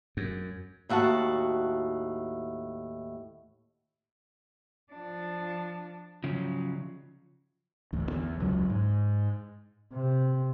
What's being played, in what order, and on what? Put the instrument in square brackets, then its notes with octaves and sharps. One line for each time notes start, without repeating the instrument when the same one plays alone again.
[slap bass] F#2
[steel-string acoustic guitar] D#2 A2 F#4 F#5 A5
[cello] F3 D4
[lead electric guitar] C#3 F3 [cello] F#3
[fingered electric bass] A1 D2
E2 E3
E1 C#2 F#2 F#3
G#2
[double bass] C3